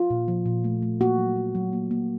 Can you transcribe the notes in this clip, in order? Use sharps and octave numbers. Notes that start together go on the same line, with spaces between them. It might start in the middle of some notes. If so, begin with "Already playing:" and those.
Already playing: F4
A#2
F3
A#2
A3
A3
A#3 F#4
F#3
A#3
F#3
A#3
A#3